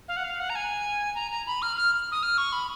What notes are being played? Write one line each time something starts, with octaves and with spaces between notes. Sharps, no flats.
F5
F#5
F5
F#5
A#5
G#5
A#5
A#5
B5
F6
F6
D#6
F6
C#6
B5